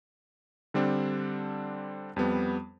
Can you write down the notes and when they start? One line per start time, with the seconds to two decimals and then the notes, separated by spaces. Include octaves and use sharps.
0.74 D3 G3 C4 D4
2.16 F2 G3 B3